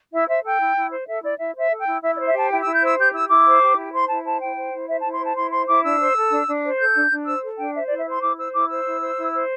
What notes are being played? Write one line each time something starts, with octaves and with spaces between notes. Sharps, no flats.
E4 E5
C5 E5
A4 G5
E4
E4
C5
A4 E5
E4 D5
E4 E5
C5 E5
A4
G5
E4
E4 E5
D5
C5
E5
G4 A5
E4 G5
E6
E4
G6
C5 E6
G4 G6
E4 E6
E4 D6
C5
G4
E4
C5 C6
E4 A5
C5 A5
E4 G5
C5
E4
C5 E5
A5
E4
C6
C5 A5
E4 C6
C5 C6
E4 D6
D4 E6
C5
A4
D4
D4
C5
A4 G6
D4
D4
C5 E6
A4
D4 G5
C5 E5
D5
E4
E5
C5 C6
E4 D6
C5 E6
E4 D6
C5 E6
E4
C5
E4
C5